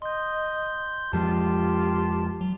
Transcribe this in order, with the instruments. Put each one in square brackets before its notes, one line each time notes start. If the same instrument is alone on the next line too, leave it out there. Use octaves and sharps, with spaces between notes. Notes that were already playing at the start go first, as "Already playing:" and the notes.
[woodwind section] D#5 [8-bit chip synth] C6 G6
[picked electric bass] F2 F3 G#3 [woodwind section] F4 [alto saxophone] G4 [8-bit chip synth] A5
[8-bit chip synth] F#3